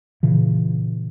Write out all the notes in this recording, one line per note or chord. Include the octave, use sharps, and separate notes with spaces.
A#2 C#3 E3